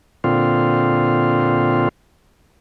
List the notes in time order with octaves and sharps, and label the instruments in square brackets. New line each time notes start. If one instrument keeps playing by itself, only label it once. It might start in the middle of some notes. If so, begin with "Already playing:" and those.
[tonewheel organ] A#2 D3 C4 F4